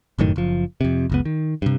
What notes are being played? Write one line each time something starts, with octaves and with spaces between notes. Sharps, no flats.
F1 F#2 A2 D#3
F#1 F3
F2 C3
F#1 C#2 B3
D#3
G2 C3